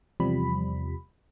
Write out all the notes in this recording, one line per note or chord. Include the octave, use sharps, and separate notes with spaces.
E2 C3 F3 G3 B5